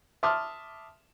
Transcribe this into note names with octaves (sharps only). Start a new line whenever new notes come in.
E5 A5 C6 D6 D#6 F6